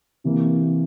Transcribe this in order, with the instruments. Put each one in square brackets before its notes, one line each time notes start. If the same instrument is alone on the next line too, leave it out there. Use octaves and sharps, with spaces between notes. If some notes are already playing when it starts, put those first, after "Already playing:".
[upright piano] C3 E3 A#3